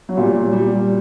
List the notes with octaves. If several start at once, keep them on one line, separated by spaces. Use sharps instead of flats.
F#3
A#2 G3
G3